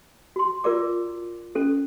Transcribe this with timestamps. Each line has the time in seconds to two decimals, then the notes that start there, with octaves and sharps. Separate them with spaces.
0.36 F#4 C6
0.64 F4 A#4 D5 D6
1.55 C#4 A4